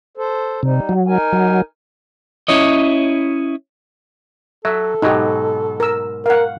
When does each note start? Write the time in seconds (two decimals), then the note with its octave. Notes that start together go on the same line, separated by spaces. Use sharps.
0.17 A4 C5
0.63 C3 G3 D#4
0.89 F#3
1.08 D#4 A#4 G#5
1.33 F#3
2.48 C#4 E4 C#5 D#5
4.65 F#3 A4 E5
5.02 G#2 B2 F#3 D#4 G4
5.80 A#4 E6
6.26 A#4 F5 F#5